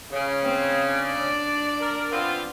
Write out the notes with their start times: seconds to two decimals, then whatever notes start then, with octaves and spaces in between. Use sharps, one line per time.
0.11 C#3
0.43 C4
0.88 D4 D5
1.81 A#4
2.11 B3 C4 F4